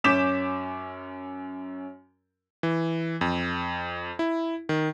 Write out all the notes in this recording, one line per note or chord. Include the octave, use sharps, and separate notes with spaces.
F#2 C#4 D6 G6 B6 E7
E3
F2
E4
D#3